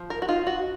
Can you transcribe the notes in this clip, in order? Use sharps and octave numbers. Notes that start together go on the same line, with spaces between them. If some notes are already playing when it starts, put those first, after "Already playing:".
Already playing: F3
A#4
F#4
D#4 F4
F#4